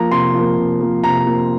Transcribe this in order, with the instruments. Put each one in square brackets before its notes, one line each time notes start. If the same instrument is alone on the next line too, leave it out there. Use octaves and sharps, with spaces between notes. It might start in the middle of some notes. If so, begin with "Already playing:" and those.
Already playing: [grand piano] F3 A#3 A#5
C3 C6
F3 A#3
C3
F3 A#3
C3 A#5
F3 A#3